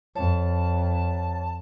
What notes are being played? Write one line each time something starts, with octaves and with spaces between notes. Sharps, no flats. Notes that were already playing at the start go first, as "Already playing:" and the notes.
F2 C#5 A5